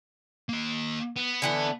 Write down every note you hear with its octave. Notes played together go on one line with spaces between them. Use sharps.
A#3 D#5
B3
D3 E3 A3